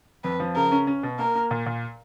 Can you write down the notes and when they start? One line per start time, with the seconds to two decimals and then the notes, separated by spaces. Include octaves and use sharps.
0.24 F2 B4
0.40 F3
0.56 C#3 A#4
0.72 C#4
0.87 C#4
1.03 B2
1.19 A#3 A#4
1.35 A#3
1.51 A#2
1.66 A#2